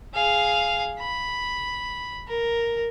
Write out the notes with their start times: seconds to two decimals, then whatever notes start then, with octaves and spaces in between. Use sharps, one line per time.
0.15 G#4 F5
0.99 B5
2.28 A#4